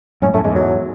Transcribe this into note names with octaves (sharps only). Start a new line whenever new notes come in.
F#2 A2 C#4
F#2 A2 A3
E2 G#2 G#3
F#3